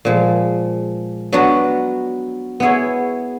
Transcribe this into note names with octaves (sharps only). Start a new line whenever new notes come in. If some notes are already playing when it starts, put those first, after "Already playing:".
A#2 F3 G#3
F#3 B3 D4 F#4 B4
B3 E4 G#4 C#5